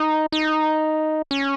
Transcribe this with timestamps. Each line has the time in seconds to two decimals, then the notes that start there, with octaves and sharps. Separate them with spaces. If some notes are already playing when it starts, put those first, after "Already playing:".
Already playing: D#4
0.32 D#4
1.31 C#4